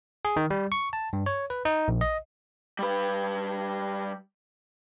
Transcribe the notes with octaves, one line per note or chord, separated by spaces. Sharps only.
G#4
D#3
G3
C#6
A5
G2
C#5
B4
D#4
A#1
D#5
G3 B4